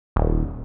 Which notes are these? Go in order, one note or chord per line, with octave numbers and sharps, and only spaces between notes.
D#1